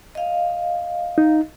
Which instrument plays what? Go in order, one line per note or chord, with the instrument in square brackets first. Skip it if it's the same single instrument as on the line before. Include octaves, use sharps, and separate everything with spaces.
[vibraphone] D#5 F5
[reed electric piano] D#4